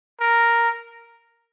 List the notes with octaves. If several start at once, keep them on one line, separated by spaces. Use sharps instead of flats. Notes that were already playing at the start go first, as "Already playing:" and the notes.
A#4